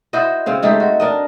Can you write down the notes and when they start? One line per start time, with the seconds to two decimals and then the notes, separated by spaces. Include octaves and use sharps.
0.13 E4 F#4 C5 D#5
0.46 C#3 C4 F5
0.63 G#3 A3 D#4 G4
0.80 F#4
1.00 D4 A#4 D#5